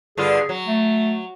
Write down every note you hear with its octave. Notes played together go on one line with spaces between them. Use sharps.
G2 D3 F4 G#4
F#3
A3